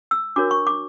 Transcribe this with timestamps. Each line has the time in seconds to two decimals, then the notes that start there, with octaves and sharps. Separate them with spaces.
0.11 E6
0.36 D4 F#4 A#4 C#5 D6
0.51 C#6
0.67 D6